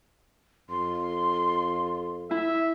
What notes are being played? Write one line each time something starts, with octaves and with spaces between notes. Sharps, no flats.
F2 C6
E4 E5